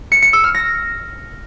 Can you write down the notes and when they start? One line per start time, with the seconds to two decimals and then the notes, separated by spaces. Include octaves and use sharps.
0.12 C#7
0.22 C#7
0.33 E6
0.44 F6
0.55 A#6